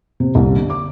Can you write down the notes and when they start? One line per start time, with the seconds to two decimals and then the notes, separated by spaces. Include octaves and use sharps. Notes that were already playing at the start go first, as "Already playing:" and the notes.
0.20 C3
0.35 C2
0.56 D3
0.70 D6